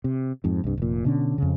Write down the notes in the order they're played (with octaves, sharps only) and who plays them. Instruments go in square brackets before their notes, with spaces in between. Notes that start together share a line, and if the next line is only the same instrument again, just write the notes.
[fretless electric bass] C3
F2 G#2
C2 G2
F1 A#2
B2 D3 C#4
F2 C#3